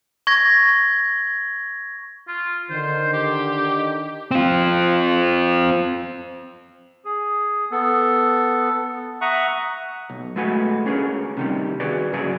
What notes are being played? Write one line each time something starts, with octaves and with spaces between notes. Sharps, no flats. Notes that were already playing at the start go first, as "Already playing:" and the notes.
C#6 G#6 A#6
F4
D3 D#3 C5
G4
C4 F4
G#4
B3 A4
E5 F#5 A#5 C#6 D#6 F#6
B1
G#3 A3 F#4 B4 G#5
C#4 D4 G#4 A#4
C3 D#3 G3
F#4 G#4 B4 D5
G2 C#3 F#3 G#4 D5